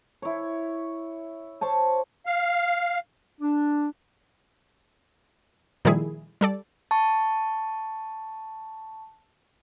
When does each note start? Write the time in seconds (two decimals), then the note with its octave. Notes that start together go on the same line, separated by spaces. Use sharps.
0.22 E4 C#5
1.61 C5 C#5 A5
2.26 F5
3.41 D4
5.85 A#2 D#3 F3 G3 E4 G#4
6.41 G3 A4 D5
6.91 A5 C#6